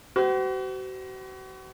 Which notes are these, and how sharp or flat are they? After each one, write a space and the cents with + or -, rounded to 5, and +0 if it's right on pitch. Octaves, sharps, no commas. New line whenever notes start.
F#4 +40 C5 -40